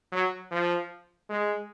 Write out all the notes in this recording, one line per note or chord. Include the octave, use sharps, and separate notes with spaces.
F#3
F3
G#3